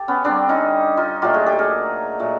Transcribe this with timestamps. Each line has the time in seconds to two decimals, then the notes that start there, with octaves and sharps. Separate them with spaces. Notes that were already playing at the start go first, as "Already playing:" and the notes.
Already playing: G4 A4
0.08 B3 C#4
0.24 D3 G3 C4 D4
0.49 C#4 D#4
0.97 D#4 F4
1.22 A#2 F#3 A3 F4 G4
1.34 F#4 G#4
1.46 G4 A4
1.59 G#4 A#4
2.19 A#2 F#3 A3